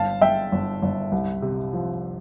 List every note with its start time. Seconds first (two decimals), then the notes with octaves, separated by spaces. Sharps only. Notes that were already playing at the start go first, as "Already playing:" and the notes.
Already playing: G1 F5 A5
0.21 G1 E5 G5
0.52 G1
0.82 G1
1.12 C2
1.42 C3
1.73 F3